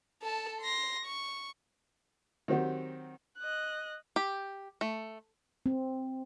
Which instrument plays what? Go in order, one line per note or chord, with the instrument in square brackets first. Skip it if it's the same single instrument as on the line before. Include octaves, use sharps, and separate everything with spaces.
[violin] A4 A5
C6 A#6
C#6
[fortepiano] D#3 F#3 C4 F#4 G4
[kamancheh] D#5 F#6
[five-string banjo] G4
A3
[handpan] C4